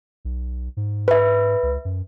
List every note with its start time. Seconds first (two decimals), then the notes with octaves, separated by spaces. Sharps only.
0.25 B1
0.77 G#2
1.08 B4 E5
1.63 C#2
1.85 F#2